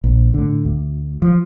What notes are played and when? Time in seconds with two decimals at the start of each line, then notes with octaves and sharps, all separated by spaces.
0.04 A#1
0.34 A2 D3
0.65 D2
1.22 F3